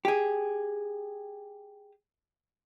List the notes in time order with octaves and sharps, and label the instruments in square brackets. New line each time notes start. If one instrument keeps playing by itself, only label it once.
[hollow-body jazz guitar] G4 G#4